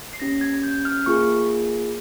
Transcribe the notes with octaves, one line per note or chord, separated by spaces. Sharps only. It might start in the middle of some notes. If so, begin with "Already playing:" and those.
C7
A#3 C#4 G4 A#6
G#6
G6
F6
A#3 F4 G#4 C#6